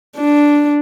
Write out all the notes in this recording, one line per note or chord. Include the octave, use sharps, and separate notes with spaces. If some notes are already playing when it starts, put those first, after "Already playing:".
D4